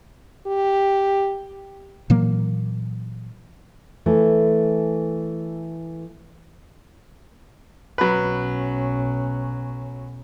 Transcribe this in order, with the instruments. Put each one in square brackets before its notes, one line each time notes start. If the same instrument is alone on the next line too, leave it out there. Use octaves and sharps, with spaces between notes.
[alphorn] G4
[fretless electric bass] A#2 E3 F#3 A#3
[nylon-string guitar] E3 A3 B4
[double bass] B1 C#4 [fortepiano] F#3 B4